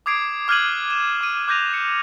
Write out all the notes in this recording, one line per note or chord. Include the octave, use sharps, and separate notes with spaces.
D6 D#6 G#6 C7 D7
D6 F6 F#6 G#6 D#7 F#7
E7
D6 D#7
D6 F#6 G6 A#6 D#7 F7
C#7